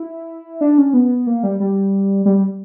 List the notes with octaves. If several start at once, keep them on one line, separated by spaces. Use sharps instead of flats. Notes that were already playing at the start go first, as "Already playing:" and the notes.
Already playing: E4
D4
C#4
B3
A#3
G3
G3
G3